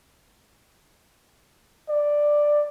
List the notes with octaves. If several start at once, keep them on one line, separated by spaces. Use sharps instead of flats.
D5